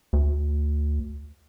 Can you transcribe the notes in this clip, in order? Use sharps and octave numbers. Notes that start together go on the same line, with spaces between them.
D2